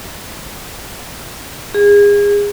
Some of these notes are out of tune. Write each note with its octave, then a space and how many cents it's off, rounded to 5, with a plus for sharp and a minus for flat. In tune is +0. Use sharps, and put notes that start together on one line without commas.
G#4 -30